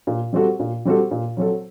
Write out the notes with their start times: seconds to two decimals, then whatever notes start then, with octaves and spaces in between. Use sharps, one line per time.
0.07 A#2
0.33 G3 C4 F#4 A4
0.60 A#2
0.85 G3 C4 F#4 A4
1.11 A#2
1.37 F#3 C4 F#4 A4